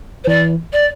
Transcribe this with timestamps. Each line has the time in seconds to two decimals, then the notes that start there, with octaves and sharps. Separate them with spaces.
0.24 C5
0.27 E3 D5
0.72 D5